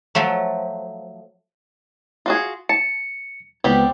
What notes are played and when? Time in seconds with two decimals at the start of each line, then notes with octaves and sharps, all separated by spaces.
0.15 F3 F#3 A3
2.26 F4 F#4 G#4
2.69 A5 C#7
3.64 C#2 G3 B3 C4 G4